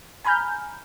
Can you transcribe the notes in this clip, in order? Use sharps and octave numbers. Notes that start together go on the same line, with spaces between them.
G#5 A#5 B5 F6 G6